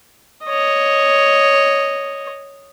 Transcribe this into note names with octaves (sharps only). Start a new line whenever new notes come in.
C#5 D#5